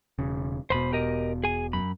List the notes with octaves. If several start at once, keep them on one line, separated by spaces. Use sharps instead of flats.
E1 C#3
E1 B2 C5 B5
G4 A#4 D#5
G#4 G#5
F#2 B5